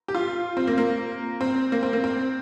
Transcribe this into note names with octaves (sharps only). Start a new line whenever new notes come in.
G4
F4
C4
A#3
A#3
C4
A#3
C4
A#3
C4